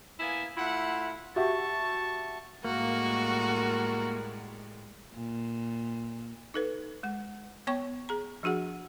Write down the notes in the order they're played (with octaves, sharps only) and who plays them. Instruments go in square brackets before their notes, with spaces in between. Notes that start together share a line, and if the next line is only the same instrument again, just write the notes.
[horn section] A#3 B3 E4 G#5
A3 E4 F4 F#5
[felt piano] F#4 G4 E5 [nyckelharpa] A5 C#6
[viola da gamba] A2 G3 G#3 [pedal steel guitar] A#3 [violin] F#4 [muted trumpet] A#4
[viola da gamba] A#2
[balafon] D#4 A4 B4
G#3 F#5
B3 C#5 G5 C#6
G#4 A#5
F3 D4 F#4 G#4 F#5